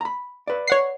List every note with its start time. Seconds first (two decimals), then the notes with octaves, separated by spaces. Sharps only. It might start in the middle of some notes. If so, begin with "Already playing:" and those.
0.01 A#5 B5
0.47 B4 D5
0.68 C#5 F#5 C7